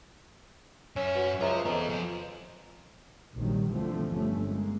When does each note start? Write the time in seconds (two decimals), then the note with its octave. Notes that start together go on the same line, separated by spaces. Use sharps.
0.96 F#2 C#4 E5
1.15 F#4 B4 F#5
1.40 C#2 F4 C5 C#5 E5 A#5
1.65 F2 E3 B3 B4 D#5 A#5
1.89 F3 G#4
3.34 F1 A#1 D#3 F#3 G3
3.69 E2 B2 D3 F3 A3 C4
4.13 G1 G2 D3 A3 C#4
4.48 G#3 A#3